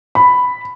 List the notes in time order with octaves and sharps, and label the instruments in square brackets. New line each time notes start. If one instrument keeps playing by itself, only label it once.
[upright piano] B5